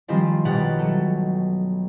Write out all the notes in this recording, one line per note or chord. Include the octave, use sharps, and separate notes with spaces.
D#3 F3 G3 G#3 C4 F4
B1 B2 G3 F#5 F6 A6
F#3 A3 A4